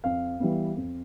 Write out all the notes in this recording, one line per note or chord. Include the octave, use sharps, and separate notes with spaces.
F2 F5
E3 G3 B3
F2